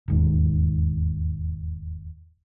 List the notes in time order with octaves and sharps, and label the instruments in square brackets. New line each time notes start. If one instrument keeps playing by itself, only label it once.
[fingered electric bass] E1 D#2 G#2